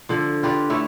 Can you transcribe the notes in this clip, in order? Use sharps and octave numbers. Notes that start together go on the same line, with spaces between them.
D3 F3
F4 G4 B4 D5
A3 E4 C#5